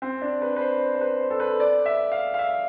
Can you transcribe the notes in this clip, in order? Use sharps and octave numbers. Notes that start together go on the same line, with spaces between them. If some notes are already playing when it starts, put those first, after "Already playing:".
C4
D4
B4
B4
C5
C5
C5
B4
C5
A4
B4
D5
E5
F5
F5
E5